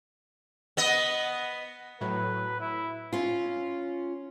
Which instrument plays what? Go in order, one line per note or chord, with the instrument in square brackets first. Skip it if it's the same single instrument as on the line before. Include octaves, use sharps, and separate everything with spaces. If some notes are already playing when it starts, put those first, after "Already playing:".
[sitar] B3 D#5
[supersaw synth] A2 F#3 [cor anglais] B4
[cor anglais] E4
[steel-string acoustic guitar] C#4 F4